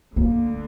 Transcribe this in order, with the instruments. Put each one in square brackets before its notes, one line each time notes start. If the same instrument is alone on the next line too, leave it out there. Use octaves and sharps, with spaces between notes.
[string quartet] D2 D3 [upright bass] A#3